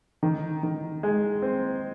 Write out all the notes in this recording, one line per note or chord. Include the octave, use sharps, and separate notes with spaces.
D#3
D#3
G#3
C4